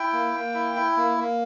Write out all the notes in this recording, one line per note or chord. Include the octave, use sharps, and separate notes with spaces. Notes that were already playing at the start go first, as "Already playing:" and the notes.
Already playing: E4 G5
A#3
A#3
E4
E4
A#3
A#3